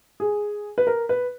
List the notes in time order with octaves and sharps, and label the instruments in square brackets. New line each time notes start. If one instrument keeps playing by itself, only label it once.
[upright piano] G#4
B4
A#4
B4